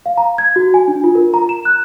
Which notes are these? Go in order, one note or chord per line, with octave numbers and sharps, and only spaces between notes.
F5
A#5
G#6
F#4
G#5
D4
F4
A#4
A#5
E7
F#6